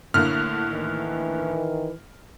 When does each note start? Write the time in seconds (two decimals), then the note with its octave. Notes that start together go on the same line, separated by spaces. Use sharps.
0.14 A2 D3 A#3 E4 F6
0.72 D#3 E3